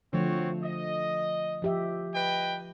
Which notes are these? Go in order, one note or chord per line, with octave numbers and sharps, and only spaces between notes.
D3 F3 A3 C4 F#4 C#5
D#5
F3 G4 E5
B4 D#5 G5